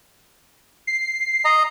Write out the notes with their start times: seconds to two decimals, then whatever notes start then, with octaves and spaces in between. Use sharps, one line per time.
0.87 C7
1.45 D#5 A#5